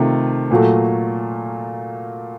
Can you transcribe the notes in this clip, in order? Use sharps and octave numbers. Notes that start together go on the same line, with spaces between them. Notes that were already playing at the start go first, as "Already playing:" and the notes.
Already playing: C3 D#3 A3 F4
A#2 F#3 A3